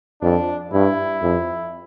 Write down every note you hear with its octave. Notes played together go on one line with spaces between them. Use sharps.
F2 D4
G2 E4
F2